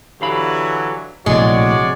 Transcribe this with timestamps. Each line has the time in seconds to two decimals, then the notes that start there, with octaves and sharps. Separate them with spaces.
0.21 D3 E3 F#3 G4 F5 B5
1.26 A#1 A2 C3 G#3 F#4 C#5 D5